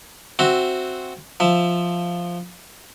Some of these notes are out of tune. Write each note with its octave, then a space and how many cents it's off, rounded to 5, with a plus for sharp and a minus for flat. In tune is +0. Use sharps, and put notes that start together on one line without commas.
C4 +0 F#4 +0 E5 +0
F3 +0 E5 +0